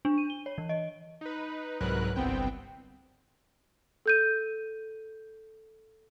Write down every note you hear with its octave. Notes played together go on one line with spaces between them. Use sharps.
D4
D#7
G7
C#5
E3
D#5
D#4 B4
C2 G#2 F#3 A#4 B4 F#6
G1 C2 B3 C4 G5
A4 G6 D#7